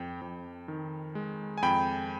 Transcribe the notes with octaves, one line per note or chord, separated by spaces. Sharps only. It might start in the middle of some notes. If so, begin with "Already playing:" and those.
Already playing: F2 G5
F2
D#3
G#3
G#5
F2 G5 B5